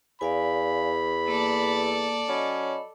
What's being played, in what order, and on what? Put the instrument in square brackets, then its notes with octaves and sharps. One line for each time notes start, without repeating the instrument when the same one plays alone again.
[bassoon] E2 [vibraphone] D5 F5 G#5 [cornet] B5
[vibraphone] A#3 [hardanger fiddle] A4 D5
[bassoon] F#3 [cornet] C#4 [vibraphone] D#5 B5